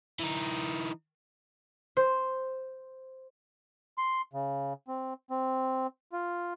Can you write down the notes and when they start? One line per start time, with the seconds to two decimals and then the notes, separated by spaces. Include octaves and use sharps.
0.19 E3 D#4
1.97 C5
3.98 C6
4.33 C#3
4.88 C4
5.30 C4
6.12 F4